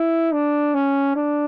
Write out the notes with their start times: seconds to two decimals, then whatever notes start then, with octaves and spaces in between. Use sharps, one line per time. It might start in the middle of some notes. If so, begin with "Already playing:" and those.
Already playing: E4
0.33 D4
0.74 C#4
1.16 D4